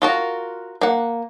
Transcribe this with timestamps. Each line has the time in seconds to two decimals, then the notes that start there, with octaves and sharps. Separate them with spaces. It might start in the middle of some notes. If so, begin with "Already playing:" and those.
0.02 F4 F#4 A#4
0.81 A#3 F#5